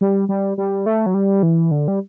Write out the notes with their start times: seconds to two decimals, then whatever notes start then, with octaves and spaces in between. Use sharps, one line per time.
0.01 G3
0.29 G3
0.58 G3
0.86 A3
1.06 F#3
1.14 G3
1.43 E3
1.71 D3
1.88 G3